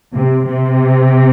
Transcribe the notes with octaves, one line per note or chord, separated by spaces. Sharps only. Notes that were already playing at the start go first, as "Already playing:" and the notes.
C3
C3